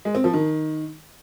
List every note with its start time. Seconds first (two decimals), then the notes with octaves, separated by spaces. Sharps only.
0.05 G#3
0.15 C4
0.24 F3
0.34 D#3